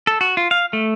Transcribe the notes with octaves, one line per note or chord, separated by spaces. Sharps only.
A4
F#4
F4
F5
A3